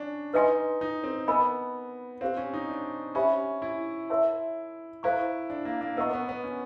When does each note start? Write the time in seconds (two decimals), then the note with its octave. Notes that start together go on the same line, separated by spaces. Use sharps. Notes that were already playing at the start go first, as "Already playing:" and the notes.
Already playing: C#4 D4
0.34 D#4 B4 D#5 G#5 C6
0.81 D#4
1.04 C4
1.28 B3 A#4 D#5 G#5 B5
2.21 C4 G4 C5 F5
2.37 C#4
2.54 D#4
2.69 D4
3.15 C#4 G4 C5 E5 G#5 B5
3.62 E4
4.10 A#4 C#5 E5 A5 C6
5.03 E4 A4 C5 F5 A#5 C#6
5.50 D4
5.65 A#3
5.81 A#3
5.97 B3 A#4 D#5 F#5 A#5 C#6
6.13 B3
6.29 B3
6.44 C#4